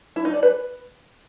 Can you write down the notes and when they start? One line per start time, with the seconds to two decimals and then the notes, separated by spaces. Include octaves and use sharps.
0.16 E4
0.25 D#4
0.34 D5
0.43 B4